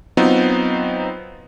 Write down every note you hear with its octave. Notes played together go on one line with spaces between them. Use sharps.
F#3 B3 C4 D#4 F4